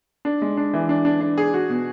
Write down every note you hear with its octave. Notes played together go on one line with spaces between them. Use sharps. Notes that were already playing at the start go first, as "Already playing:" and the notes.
D4
G#3
D4
E3
D4
D4
D4
G#4
F#4
B2